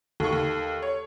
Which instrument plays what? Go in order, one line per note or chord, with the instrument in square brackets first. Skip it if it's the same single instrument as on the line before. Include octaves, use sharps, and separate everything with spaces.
[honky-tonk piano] D#2 C#6 [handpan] A4
[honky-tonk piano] D#2
C#5